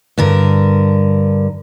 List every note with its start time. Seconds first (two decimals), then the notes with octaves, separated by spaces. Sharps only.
0.18 G2 D3 A#4